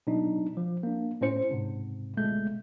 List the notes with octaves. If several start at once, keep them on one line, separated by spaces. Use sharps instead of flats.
B2 F#3 D4 D#4
F3
A#3 D4
A2 C#4 C5 C#7
G#2 C3
G1 B2 G#3 A3 G6